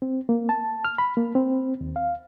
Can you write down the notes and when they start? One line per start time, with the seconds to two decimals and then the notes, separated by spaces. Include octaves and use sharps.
0.02 C4
0.29 A#3
0.49 A5
0.85 F6
0.98 B5
1.17 A#3
1.35 C4
1.81 D#2
1.96 F5